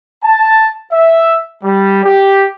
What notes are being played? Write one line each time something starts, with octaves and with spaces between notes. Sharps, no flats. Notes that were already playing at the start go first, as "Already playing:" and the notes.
A5
E5
G3
G4